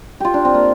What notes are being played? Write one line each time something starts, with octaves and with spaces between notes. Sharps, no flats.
F4 G4
D4
C4
A#3